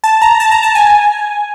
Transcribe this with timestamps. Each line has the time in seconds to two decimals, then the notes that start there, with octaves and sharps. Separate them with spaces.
0.04 A5
0.22 A#5
0.40 A5
0.51 A#5
0.63 A5
0.75 G#5